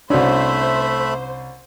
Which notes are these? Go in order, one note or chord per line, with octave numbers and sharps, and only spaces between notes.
C2 A3 C#4 D4 F#4 C5 E5 B5